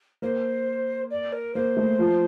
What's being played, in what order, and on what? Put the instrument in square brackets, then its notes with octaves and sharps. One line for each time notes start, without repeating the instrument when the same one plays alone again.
[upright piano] A#3 [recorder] C5
[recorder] D5
A#4
[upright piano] A#3 [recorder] C5
[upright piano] A3
F3